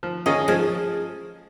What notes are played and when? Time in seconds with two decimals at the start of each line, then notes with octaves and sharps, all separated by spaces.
0.03 F3
0.26 D#3 C#4 G#4 D#5
0.48 F3 G#3